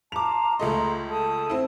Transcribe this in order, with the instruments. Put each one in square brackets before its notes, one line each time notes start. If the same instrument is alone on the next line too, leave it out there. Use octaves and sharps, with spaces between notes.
[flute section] F4 A5 A#5 [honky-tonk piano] D6 F7
[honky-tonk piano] C#2 A3 D#5 [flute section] A#5 C6
[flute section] A4 A5 D#6
[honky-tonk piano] C4 E4